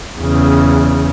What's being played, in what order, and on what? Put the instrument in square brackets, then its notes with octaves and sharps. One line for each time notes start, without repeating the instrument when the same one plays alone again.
[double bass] E2 C#3